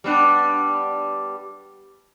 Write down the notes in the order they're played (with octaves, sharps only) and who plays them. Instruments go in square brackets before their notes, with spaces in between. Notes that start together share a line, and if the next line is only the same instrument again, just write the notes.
[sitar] G3 B3 D4